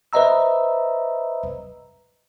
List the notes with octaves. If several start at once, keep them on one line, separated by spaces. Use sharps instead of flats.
B4 C5 D#5 E5 A#5 E6